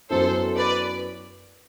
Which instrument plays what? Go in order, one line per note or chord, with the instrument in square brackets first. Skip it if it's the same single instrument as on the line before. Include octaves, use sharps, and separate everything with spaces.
[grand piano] F#2 F#3 B3 E4 [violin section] A4 C5
[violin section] B4 D5